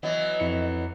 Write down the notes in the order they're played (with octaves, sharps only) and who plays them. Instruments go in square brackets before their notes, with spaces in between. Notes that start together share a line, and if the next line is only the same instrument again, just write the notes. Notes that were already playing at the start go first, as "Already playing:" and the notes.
[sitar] E3 F#3 B3 [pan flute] D#5
[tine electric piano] F2 E4 C#7